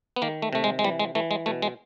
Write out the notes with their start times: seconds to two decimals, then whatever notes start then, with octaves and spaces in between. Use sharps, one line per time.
0.16 B3
0.22 D#3 A#3
0.42 A3
0.53 C3 A3
0.64 G#3
0.79 G#3
0.84 E3 G3
1.00 G#3
1.15 E3 A3
1.31 G#3
1.46 B2 A3
1.62 G#3